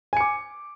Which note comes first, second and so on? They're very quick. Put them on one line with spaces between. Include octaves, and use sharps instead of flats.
G#5 C#7 D6